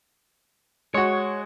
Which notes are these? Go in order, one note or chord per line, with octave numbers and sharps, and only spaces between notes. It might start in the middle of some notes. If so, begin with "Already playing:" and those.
G#3 F#4 C#5